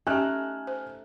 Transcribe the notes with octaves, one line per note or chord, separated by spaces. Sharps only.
A3 C#4 D#4 G4 G#5 F6 F#6
C5